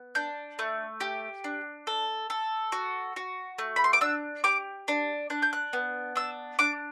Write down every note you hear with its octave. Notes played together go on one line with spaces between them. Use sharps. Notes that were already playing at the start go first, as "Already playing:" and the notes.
Already playing: B3
D4 G6
A3
G4
D4
A4
A4
F#4
F#4
A3
B5
C6
D6
D4 E6
G4 D6
D4
D4 F#6
G6
F#6
B3
D4 E6
D4 D6